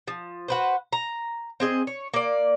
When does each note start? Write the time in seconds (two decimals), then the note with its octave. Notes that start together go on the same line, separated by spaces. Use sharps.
0.08 F3
0.48 F#4 B4 C5
0.93 A#5
1.60 C4 G#4 D#5
1.87 C#5
2.14 A#3 D5